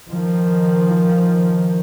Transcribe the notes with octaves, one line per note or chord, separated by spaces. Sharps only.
D#3 F3